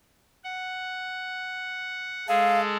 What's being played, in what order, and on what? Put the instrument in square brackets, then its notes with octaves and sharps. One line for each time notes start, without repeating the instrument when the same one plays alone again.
[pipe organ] F#5
[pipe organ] G#3 G#4 A4 [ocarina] F5